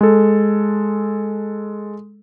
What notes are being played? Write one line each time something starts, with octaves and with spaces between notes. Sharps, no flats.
G#3 A4